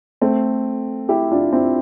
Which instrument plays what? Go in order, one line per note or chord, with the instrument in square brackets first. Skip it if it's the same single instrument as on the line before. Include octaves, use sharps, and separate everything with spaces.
[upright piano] A3 C4
E4 G4
D4 F4
C4 E4